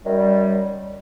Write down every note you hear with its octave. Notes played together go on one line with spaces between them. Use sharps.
F#2 D#3 G3